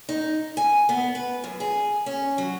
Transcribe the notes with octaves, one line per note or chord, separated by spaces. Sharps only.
D#4
G#5
B3
B4
F#2
G#4
C#4
F#3